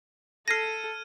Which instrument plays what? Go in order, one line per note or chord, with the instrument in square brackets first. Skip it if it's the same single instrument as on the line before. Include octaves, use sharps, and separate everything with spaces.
[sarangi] A4 [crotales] F6 G#6 D#7 [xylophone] A#6 C7